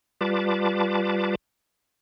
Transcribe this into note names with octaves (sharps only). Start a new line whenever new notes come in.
G3 F4 B4 A5 D6